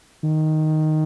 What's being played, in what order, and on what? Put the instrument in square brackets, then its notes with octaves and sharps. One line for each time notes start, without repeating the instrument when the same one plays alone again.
[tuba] D#3